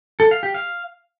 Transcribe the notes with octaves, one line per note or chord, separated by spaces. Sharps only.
A4
F5
G4
F5